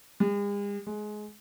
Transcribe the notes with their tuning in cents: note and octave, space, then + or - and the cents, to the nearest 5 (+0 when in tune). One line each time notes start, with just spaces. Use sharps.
G#3 -45
G#3 +20